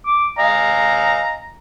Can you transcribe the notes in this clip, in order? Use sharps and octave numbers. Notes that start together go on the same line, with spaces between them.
D6
D#5 F5 G#5 A#5